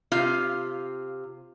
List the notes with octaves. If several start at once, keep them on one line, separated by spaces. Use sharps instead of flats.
C3 F4 F5